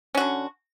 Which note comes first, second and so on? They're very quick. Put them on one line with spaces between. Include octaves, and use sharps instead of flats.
C#4 F#4 D3